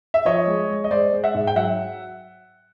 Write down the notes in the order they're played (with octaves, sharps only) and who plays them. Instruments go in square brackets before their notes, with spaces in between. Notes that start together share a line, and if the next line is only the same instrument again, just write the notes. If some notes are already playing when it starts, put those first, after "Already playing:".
[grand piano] E5
F3 C#5 D#5
G#3
G#3
D#5
G#3 C5 D5
G#3
E5 F#5
G#2
G5
F#3 E5 F#5